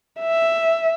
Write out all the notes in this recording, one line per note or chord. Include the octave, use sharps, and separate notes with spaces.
E5